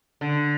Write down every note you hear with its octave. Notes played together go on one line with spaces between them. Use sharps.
D3